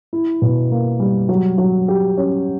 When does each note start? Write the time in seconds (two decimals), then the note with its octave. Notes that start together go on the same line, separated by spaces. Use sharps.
0.13 E4
0.42 B2
0.71 A#3
1.00 G3
1.29 F#3
1.58 F#3
1.88 G4
2.17 C#4